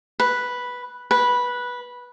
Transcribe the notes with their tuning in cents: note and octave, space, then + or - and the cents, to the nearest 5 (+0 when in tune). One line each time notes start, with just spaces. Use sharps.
B4 -5
B4 -10